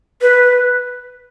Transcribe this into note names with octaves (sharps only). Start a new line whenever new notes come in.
B4